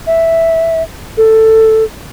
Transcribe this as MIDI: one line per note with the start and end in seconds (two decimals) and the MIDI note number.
0.07 0.82 76
1.17 1.83 69